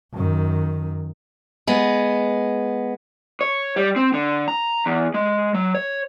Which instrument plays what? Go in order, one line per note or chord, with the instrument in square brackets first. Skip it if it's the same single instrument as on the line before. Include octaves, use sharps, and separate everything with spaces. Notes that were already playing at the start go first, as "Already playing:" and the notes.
[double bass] F#2 D#3
[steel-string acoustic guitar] G#3 B3
[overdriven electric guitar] C#5
G3
C4
D3
A#5
E2
G#3
F#3
C#5